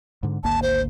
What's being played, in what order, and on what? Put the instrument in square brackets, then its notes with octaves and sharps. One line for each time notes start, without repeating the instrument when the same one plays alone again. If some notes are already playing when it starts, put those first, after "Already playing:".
[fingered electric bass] G#2 D3
[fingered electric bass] G#1 D2 A#3 [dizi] A5
[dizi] C5